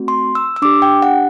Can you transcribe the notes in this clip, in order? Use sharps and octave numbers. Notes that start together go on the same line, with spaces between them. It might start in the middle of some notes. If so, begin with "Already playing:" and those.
Already playing: A3 C4 F#4
C6
E6
E6
D4 G4 D6
G5
F#5